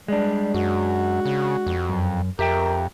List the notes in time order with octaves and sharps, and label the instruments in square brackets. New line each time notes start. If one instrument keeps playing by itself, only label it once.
[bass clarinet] G3 [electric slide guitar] G#3 D4
[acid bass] F#2 [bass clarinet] F#4
[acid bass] C#3
F2
[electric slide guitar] F#2
[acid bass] F2 [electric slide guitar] G4 E5 G5 [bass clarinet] A#4